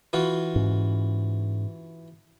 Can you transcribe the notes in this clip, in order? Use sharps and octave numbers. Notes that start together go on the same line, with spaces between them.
E3 F4 F#4
G#2 C#4